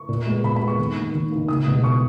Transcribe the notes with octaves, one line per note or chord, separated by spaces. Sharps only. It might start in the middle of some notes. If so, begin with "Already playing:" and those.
Already playing: C#6
A#2
G#3 B3
A#2 B5
B5
G#3 B3
C#6
D#2
D#3 A#3
D#2
D#3 A#3
C#2 D#6
B2 G#3 B3
C#6